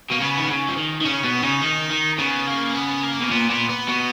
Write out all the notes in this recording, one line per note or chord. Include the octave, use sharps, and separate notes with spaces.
B2 A#3
C#3 B3
D#3
C#3
F3
D#3
D#3
C#3 C#4
B2 B3
C#3 D#4
D#3
D#3
C#3 B3
A#3
B3
A#3
B2
A#2 B3
A#2 B3
B3
B2